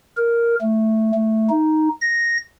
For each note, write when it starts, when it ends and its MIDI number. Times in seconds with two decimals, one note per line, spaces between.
0.17 0.55 70
0.61 1.12 57
1.14 1.50 57
1.50 1.89 63
2.01 2.38 94